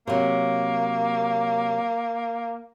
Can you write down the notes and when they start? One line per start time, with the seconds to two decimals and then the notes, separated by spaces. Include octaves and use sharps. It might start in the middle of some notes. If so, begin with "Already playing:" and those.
0.07 C3 F#3 A#3